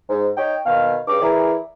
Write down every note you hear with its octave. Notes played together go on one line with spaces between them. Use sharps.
G#2
D#4 C#5 G5
B2 D#3 F5
G2 C#3 D6
E3 E4 G#4 A#4 D5